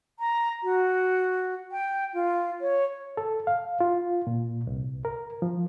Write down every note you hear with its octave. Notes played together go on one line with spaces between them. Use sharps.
A#5
F#4
G5
F4
C#5
A4
F5
F4
A#2
C2
A#4
F3